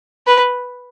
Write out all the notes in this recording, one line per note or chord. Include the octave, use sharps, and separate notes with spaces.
B4